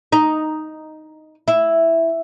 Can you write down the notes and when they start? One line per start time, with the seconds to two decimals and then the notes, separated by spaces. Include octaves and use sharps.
0.12 D#4
1.48 E4